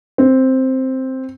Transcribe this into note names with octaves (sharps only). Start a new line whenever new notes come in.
C4